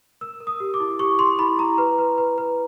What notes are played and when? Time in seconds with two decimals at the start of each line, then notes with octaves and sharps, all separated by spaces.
0.21 A#4 E6
0.40 A#4
0.47 D#6
0.60 G4
0.74 D6
0.80 E4
0.99 G4 C#6
1.19 E4 C6
1.39 E4 B5
1.59 E4 A#5
1.78 B4
1.98 B4
2.18 B4
2.38 B4